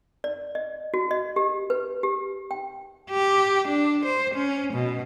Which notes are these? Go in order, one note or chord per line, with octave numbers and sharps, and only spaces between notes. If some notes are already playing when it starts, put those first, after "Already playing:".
D5
D#5
F#4
D#5
G4
B4
G4
G5
G4
D4
C5
C#4
B2